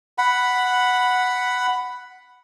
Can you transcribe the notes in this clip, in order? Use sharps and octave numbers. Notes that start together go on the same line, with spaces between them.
F#5 B5